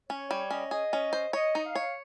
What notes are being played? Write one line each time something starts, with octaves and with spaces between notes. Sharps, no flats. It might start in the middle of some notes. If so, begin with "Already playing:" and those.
C#4 C#5
G3 C#5
C#4 D#5
G#4 D#5
C#4
C5
C#5 D#5
D#4
F5
C#5